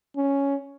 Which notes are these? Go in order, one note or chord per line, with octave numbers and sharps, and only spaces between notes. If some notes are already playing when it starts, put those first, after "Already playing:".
C#4